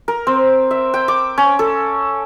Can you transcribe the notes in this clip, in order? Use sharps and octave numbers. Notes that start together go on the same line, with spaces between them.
A#4
C4
E5
G5
D6
C#4
A4